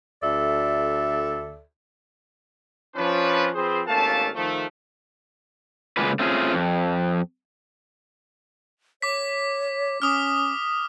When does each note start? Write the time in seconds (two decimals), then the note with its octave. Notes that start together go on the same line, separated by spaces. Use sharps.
0.23 D2 A4 D5 E5
2.96 F3 C#4 D4 B4
3.55 F3 C4 G#4 B4 C5
3.88 G#1 A3 A#3 C#4 F5 A5
4.35 D#3 F3 A3
5.97 C#3 G#3 A#3 F4 B4
6.19 A3 C4 C#4 F4 G#4
6.53 F2
9.02 C#5 D6 B6
10.02 C#4 D6 D#6 F6